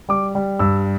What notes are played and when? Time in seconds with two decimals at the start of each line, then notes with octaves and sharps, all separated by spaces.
0.09 G3 D6
0.35 G3
0.59 G2 E6